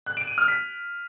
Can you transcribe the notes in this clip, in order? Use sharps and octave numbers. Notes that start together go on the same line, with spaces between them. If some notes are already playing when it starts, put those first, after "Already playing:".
F#6
D7
D#7
F6
B6